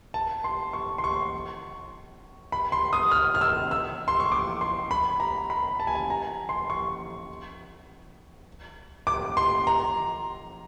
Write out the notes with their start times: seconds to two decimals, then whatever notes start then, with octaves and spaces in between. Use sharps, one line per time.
0.14 A5
0.44 C6
0.73 C#6
0.98 C6
1.04 C#6
2.52 B5
2.72 C6
2.93 D#6
3.11 F6
3.35 F6
3.41 E6
3.71 E6
4.08 C6
4.20 C#6
4.32 D6
4.61 C6
4.91 B5
5.20 A#5
5.50 B5
5.80 A5
5.87 G#5
5.95 A5
6.10 A#5
6.49 C6
6.70 C#6
9.07 D6
9.37 C6
9.67 A#5